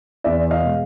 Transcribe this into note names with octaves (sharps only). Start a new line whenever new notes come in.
E2 D5 E5
D#5 F5
B2 G#3